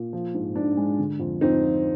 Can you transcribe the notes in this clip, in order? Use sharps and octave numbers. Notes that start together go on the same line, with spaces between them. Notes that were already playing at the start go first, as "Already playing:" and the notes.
Already playing: A#2
F3
G#2
G#2 D4
G#3
D3
F2
F2 C4 D#4
F3